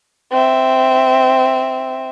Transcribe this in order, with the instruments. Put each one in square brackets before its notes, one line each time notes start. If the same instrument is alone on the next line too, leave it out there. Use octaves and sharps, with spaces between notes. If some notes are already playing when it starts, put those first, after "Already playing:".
[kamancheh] C4 E5